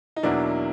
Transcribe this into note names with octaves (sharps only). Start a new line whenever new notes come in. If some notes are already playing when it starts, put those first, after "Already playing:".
D#4
E2 B2 F#3 A#3 D4 E4